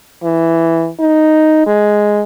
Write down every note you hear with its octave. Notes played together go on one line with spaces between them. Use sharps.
E3
D#4
G#3